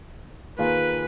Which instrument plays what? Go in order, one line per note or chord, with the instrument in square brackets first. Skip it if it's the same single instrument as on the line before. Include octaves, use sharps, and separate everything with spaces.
[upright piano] D#3 A#3 F4 G#4 [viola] B4